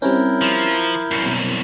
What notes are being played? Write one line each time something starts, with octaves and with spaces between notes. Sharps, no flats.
G3 C4 C#4 E4 A#4 G6
F3
C2 F#2 C7 C#7
B2